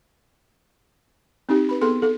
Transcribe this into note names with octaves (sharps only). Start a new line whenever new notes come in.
C4 D#4 G4
B4 B5
B3 G#4 A4 C6
A4